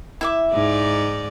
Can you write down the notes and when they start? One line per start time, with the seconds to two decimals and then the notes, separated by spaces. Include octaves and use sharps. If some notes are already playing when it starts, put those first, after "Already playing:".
0.21 E4 E5 D6
0.53 G#2 D#4 D5